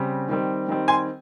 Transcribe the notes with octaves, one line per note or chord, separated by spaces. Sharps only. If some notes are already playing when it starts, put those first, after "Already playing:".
Already playing: C#3 G3 C4
D#3 G3 C4
D#3 G3 C4
G#5 C6